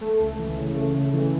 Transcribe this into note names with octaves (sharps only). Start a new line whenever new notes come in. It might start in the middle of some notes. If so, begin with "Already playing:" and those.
A3
C#2
E3
C#3
A3
C#3
E3